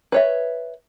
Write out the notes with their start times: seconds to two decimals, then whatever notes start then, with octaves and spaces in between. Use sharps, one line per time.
0.12 B4 C#5 E5